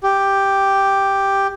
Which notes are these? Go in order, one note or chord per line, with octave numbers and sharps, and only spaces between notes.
G4